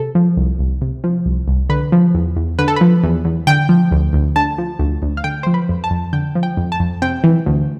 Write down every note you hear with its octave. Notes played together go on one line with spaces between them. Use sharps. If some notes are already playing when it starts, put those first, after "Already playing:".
Already playing: C3 A4
F3
C2
C2
C3
F3
C2
C2
D3 B4
F3
E2
E2
D3 B4
A4
F3 B4
E2
E2
D3 G5
F3
D2
D2
D3 A5
F3
D2
D2
F5
D3 G5
F3 C5
B4
F2
A5
F2
D3 G5
F3
G5
F2
A5
F2
C3 G5
E3
D2